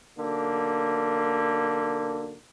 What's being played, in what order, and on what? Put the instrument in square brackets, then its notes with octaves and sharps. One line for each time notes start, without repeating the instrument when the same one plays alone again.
[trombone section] B1 D3 A#3